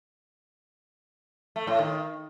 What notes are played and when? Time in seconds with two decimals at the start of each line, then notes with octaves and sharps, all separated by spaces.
1.56 A3
1.67 A2
1.79 D#3